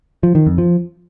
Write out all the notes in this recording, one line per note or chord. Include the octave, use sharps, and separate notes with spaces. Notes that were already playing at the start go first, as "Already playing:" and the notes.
F3
D#3
F2
F3